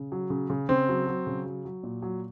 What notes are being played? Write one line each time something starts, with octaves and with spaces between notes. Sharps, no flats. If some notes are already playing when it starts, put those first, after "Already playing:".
Already playing: C#3
F#3
C#3
C#3
C#3 C4
F#3
F#3
C#3
F#3
F#3
A#2
F#3